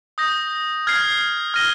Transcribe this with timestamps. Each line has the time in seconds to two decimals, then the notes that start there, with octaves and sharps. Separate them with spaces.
0.18 D#6 G6 A#6
0.87 F6 G#6 C7
1.54 F6 A#6 D#7 G7